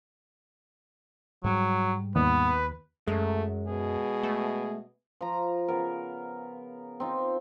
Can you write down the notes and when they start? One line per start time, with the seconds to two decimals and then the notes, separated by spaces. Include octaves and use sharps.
1.44 G#2 F#3 G3
2.16 D#2 B3 B4
3.08 F#2 G#3 A3
3.67 B2 G#4
4.23 A3
5.21 F3 A#5
5.68 C#3 B3 A#4
7.00 C4 D#4 F4